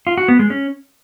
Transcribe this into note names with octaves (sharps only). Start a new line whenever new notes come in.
F4
F#4
B3
G#3
C#4